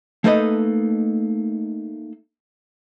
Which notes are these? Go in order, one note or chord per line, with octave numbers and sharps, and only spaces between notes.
A3 A#3 D#4 A4 B4 D#5